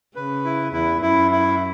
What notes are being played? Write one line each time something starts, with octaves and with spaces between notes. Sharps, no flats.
C#3 B4
E4
E2 E4
F#2 E4
E4